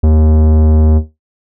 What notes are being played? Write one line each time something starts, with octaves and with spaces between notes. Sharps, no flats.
D#2